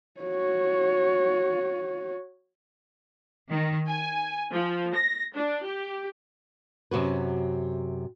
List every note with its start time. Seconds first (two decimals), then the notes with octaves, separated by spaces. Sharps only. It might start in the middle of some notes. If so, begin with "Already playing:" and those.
0.20 F#4 C#5
3.50 D#3
3.88 G#5
4.52 F3
4.96 A#6
5.36 D4
5.66 G4
6.91 F#2 C3 F#4 B4